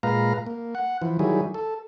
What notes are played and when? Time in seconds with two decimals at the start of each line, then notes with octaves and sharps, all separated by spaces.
0.03 A#2 G#3 B4 F5 A#5
0.46 A#3
0.75 F#5
1.02 E3 F3
1.19 D#3 F#3 G3 E4 G#4
1.54 A4